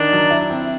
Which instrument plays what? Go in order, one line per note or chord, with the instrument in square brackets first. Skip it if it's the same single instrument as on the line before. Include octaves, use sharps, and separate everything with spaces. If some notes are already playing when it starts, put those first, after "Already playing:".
Already playing: [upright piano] D#3 [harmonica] D4
[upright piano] F#3
E4
C4